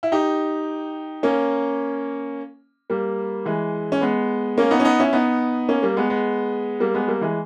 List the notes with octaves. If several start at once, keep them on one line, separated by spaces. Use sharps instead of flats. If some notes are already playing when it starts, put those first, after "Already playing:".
E4
D#4 G4
A#3 C#4
G3 A#3
E3 G#3
C#4
G#3 B3
A#3 C#4
B3 D#4
C#4
B3 D#4
C#4 E4
B3 D#4
A#3 C#4
G3 A#3
G#3 B3
G#3 B3
G3 A#3
G#3 B3
G3 A#3
E3 G#3